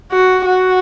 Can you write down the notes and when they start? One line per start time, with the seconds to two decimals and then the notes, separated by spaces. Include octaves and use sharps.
0.11 F#4
0.45 F#4